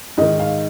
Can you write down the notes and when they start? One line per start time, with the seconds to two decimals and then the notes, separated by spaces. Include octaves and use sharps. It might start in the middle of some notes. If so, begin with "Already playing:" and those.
0.17 G#2 D#5
0.21 D#3
0.39 F5